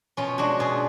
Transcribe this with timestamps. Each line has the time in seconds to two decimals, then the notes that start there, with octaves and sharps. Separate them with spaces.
0.17 B2 C#4 F4
0.38 G#3 D4 F#4
0.59 B2 F4 G#4